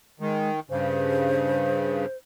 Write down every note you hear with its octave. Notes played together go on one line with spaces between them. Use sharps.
D#3 G#3
G2 C#3 C5